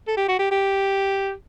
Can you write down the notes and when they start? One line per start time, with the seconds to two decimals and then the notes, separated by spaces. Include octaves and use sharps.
0.08 A4
0.17 G4
0.28 F#4
0.39 G4
0.52 G4